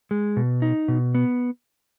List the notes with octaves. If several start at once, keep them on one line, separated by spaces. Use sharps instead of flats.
G#3
B2
D#4
B2
B3